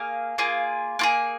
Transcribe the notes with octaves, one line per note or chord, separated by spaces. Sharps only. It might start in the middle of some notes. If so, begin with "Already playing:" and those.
Already playing: A#3 G#4 F5
A#3 F4 G#4
A#3 F4 G#4